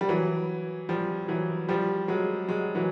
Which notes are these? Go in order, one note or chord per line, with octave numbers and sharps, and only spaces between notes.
G3
E3 F#3
F3 G3
E3 F#3
F3 G3
F#3 G#3
F#3 G#3
E3 F#3